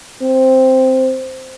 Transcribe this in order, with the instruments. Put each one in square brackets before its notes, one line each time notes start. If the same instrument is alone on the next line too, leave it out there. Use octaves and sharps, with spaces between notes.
[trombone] C4